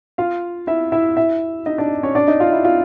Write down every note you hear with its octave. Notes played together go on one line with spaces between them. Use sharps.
F4 F5
E4 E5
E4 E5
E4 E5
D#4 D#5
D4 D5
C#4 C#5
D4 D5
D#4 D#5
F4 F5
E4 E5
F4 F5